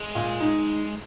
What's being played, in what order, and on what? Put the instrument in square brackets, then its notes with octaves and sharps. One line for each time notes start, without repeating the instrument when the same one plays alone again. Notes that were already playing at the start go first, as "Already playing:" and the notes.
Already playing: [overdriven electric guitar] G#3
[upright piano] A#2
D#4